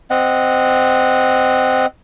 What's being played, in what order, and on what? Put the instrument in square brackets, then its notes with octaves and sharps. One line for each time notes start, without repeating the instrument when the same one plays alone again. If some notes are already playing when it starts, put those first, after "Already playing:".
[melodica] C4 D#5 F#5